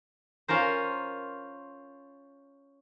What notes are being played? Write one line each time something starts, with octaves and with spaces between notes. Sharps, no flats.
C#4 F4 A#4 C5